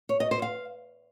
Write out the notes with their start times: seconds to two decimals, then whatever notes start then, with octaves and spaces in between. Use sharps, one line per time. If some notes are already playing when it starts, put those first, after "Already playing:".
0.09 C#5
0.20 D#5
0.31 C5
0.42 F5